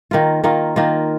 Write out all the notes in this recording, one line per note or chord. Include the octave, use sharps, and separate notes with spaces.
D#3 A#3 F4
D#3 A#3 F4
D#3 A#3 F4